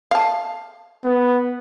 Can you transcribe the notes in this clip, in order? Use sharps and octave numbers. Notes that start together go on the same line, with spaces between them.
F5 A5
B3